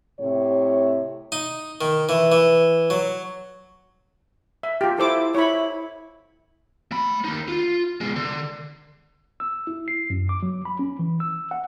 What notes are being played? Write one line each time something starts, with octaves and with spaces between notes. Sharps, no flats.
A2 C3 C#5
D#4
D#3
E3
E3
F#3
E5
F4 G4
E4 A4 C5 D6
E4 C#5 B5
A3 B5
D#2 D#4
F4
B2 G#3
D3
E6
E4
C7
F#2
D6
F#3
B5
C#4
E3
E6
F#5